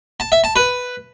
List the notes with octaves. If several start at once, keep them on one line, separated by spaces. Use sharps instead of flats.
A5
E5
A5
B4